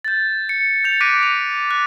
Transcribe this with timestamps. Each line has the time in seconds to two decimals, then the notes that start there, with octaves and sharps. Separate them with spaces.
0.05 G6 A6
0.49 C#7
0.84 G6 A6 F7
1.01 D6 F#6 A#6 B6 D7 D#7
1.23 F7
1.71 F#6